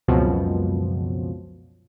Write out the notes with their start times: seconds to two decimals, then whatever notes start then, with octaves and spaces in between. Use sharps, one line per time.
0.08 C#2 F#2 B2 F3 F#3 C4